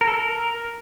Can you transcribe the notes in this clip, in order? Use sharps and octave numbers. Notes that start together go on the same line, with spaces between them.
A#4
A4
A#4